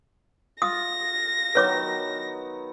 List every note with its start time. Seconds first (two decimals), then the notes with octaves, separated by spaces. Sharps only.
0.62 F4 D#6 A#6
1.55 D#3 F#3 B3 B4 C#5 D6